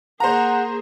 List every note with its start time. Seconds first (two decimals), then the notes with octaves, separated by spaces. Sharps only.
0.20 A#3 G#4 C5 F#5 A#5